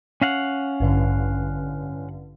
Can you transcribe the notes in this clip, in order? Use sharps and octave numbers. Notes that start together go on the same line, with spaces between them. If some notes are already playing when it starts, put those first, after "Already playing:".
C#4 F5 F#5
A1 G2 D3